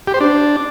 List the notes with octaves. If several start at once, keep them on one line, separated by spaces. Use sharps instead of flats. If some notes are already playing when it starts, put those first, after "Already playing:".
G4
C5
D4